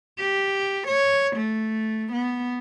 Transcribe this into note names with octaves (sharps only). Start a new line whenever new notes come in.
G4
C#5
A3
B3